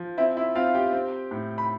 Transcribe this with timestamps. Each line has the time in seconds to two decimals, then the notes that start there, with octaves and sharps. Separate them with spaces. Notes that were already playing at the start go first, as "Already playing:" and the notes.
Already playing: F3
0.18 C4 E4 E5
0.37 E4 E5
0.55 C4 F4 F5
0.75 G4 G5
0.93 C4
1.31 A2
1.58 B5